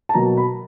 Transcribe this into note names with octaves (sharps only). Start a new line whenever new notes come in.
A5
B2 F#3 A#3 A#5
B5